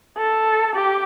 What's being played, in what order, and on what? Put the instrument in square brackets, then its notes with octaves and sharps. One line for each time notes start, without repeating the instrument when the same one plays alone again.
[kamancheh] A4
G4